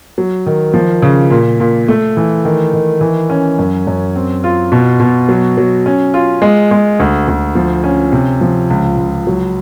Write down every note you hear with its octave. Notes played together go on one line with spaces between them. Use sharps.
F#3
D#3
F3
C#3
A#2
A#2
A3
E3
D#3
D#3
E3
C#4
F#2
F#2
C4
F4
B2
B2
F#3
F#3
C#4
F4
G#3
G#3
D2
D2
F3
C#4
C3
F3
C#2
C#2
F#3